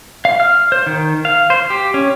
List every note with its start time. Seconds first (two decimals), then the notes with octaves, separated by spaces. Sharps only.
0.25 F5
0.40 F6
0.72 C5
0.86 D#3
1.25 F5
1.50 C5
1.70 G4
1.94 C#4